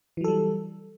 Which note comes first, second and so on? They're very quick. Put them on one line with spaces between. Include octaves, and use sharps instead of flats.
E3 F#3 A4 G3